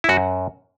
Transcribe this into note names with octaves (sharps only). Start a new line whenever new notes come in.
E4
F#2 F#4